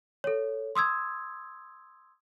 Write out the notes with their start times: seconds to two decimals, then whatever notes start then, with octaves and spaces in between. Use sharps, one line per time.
0.24 A4 C#5
0.75 C6 D#6 E6 G#6